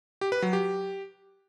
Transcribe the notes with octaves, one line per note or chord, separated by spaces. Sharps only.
G4
B4
F#3
G4